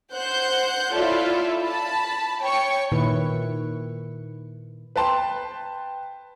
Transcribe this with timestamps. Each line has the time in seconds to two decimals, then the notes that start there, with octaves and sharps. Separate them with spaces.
0.14 C5 F#5 F#6 G6
0.94 E4 F4 A4 C#5 D5 E5
1.62 A5 B5
2.41 C#5 G5 C#6
2.92 A#2 D#3 E4 B4
4.96 B4 G5 A5 C6